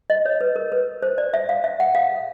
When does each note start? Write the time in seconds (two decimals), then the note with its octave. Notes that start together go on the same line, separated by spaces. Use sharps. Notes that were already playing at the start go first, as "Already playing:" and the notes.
0.10 D#5
0.25 C#5
0.41 B4
0.56 A#4
0.72 B4
1.03 C5
1.18 D5
1.34 E5
1.49 F5
1.64 E5
1.80 F#5
1.95 F5